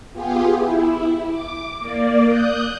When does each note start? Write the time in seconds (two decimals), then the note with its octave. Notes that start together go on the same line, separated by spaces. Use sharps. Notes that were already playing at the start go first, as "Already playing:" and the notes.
0.12 B3 F4 G4 G#4
0.54 E4
1.29 D6
1.78 A#3 D5
2.24 D#6 F#6 G6